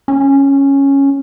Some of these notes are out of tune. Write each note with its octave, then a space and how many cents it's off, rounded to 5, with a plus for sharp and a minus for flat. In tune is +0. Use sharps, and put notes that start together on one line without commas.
C#4 -5